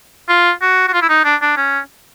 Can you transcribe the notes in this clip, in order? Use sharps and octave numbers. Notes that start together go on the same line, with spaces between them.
F4
F#4
F#4
F4
E4
D#4
D4
D4
C#4